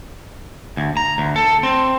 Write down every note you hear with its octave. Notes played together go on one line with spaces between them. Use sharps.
D2
A#5
D2
A4
C4